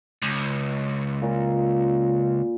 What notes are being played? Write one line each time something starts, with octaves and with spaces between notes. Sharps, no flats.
C#2
A#2